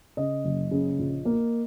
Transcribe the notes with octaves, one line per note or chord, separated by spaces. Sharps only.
C#3 D#5
F#1
C#3
A#1
A#3